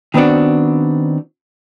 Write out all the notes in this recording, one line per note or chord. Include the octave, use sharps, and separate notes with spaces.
D#3 B3 C4 D4 F#4